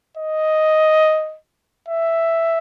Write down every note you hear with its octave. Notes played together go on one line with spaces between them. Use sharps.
D#5
E5